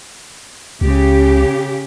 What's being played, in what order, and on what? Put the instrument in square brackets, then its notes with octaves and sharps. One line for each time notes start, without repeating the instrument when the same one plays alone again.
[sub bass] C#2 [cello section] C#3 G4